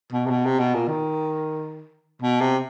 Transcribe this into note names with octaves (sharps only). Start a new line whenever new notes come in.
B2
C3
B2
C3
B2
A#2
D#3
B2
C3